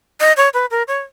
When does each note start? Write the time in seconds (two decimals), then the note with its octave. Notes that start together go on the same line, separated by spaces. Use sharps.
0.20 D#5
0.37 C#5
0.54 B4
0.71 A#4
0.88 C#5